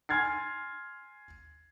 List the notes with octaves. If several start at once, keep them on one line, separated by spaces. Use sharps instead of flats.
G#5 C6 F6 G#6 A6 C7